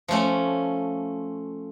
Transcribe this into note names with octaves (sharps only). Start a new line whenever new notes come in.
F3 A3 C#4